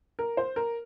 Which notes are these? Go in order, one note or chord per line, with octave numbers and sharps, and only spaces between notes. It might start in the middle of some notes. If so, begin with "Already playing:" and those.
A#4
C5
A#4